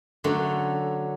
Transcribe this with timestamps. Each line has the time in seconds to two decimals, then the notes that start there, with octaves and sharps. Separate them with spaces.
0.24 D3 F#3 A3 C#4